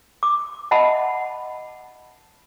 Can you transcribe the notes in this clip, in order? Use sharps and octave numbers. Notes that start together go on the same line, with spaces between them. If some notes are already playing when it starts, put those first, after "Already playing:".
D6
D#5 E5 F#5 A5 B5